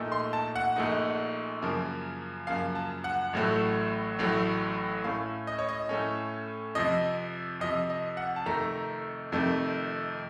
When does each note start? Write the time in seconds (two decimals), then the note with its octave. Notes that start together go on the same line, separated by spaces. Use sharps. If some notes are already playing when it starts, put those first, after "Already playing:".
Already playing: A#1 A#2 A3 D#4
0.12 C6
0.33 A5
0.56 F#5
0.76 A#1 A#2 A3 D#4
1.62 F#2 C#3 F3 A#3
2.47 F#2 C#3 F3 A#3 F5
2.75 A5
3.04 F#5
3.33 A1 A2 F#3 A3
4.19 A1 A2 F#3 A3
5.04 A2 A3 C#4 F5
5.47 D#5
5.58 C#5
5.69 D#5
5.89 A2 A3 C#4
6.75 F2 C3 F3 D#5
7.60 F2 C3 F3 D#5
7.90 D#5
8.17 F#5
8.36 A5
8.46 F2 C3 D#3 A3 A#5
9.32 F2 C3 D#3 A3